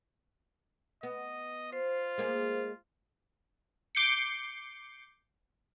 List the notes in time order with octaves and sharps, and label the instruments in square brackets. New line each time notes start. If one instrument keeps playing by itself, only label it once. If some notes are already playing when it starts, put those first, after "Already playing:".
[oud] B3 [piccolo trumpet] D#5
[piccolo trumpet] F4 [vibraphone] C5
[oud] G#3 A#3 G#4
[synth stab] D6 G6 C7 C#7